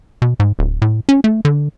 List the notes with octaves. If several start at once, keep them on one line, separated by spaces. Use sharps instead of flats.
B2
G#2
D1
A2
C#4
A3
D3